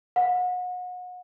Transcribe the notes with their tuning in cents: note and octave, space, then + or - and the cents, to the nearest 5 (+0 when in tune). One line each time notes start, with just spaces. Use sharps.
F#5 -35